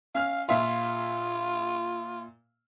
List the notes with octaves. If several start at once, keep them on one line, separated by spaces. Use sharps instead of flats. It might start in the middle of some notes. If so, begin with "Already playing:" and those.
C#4 F5 F6
A#2 F4 E5 F5